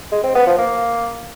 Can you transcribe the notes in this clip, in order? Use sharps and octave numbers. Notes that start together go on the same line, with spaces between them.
G#3
C4
B3
F3
A#3